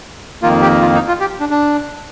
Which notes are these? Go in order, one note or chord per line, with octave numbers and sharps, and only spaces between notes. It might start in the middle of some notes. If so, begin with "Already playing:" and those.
F2 D#3 A#3 F4
G4
F4
D#4
F4
G4
D4
D4